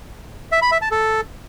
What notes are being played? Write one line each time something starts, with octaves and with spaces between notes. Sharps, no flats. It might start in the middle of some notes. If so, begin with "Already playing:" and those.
E5
B5
E5
A5
A4